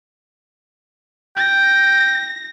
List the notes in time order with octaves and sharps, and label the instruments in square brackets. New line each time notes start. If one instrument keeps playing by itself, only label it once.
[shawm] G5 [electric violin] A#6